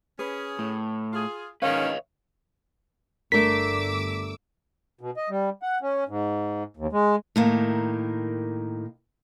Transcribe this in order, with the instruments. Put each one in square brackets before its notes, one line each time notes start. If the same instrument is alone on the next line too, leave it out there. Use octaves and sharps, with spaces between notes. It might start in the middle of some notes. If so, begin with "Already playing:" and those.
[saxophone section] C#4 G#4 [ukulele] B4
[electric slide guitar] A2
[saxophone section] F4 G#4
[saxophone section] G#2 D#3 C#4 [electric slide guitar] B4 C#5 D#5 [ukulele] F5
[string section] G1 D6 E6 [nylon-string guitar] A3 D4 A#4 [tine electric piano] B6
[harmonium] B2
D#5
G3
F#5
C#4
G#2
D#2
G#3
[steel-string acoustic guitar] A2 D#3 A#3